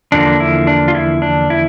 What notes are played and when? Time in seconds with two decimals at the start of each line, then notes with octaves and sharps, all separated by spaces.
0.12 E2 D3 F3 A#3 D4
0.40 E4
0.67 D4
0.88 F4
0.95 E4
1.22 D4
1.50 E4